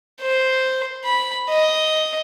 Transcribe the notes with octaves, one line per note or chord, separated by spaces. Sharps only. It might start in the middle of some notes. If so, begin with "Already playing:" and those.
C5
B5
D#5